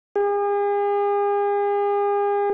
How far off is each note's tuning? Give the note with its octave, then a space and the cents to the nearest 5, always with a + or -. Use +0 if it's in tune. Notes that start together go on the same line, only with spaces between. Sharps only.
G#4 -40